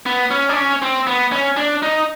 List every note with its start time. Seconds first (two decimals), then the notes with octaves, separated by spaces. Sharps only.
0.06 B3
0.31 C#4
0.49 D4
0.56 C#4
0.82 C4
1.07 B3
1.32 C#4
1.57 D4
1.82 D#4